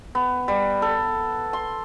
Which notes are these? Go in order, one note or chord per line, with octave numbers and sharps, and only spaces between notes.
B3
G3
A4
C6